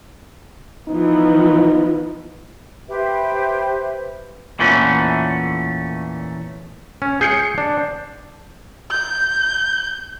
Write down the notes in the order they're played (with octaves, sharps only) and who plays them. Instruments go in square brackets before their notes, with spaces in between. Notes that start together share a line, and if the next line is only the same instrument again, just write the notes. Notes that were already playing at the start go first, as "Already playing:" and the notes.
[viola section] E3 F3 B3 [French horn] D#4
[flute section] G4 B4 C5 E5
[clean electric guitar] E2 A#2 E3 A3 C#4
[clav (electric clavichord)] C#4
[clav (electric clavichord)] G#4 [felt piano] G6 C7 C#7
[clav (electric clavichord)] D4
[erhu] G6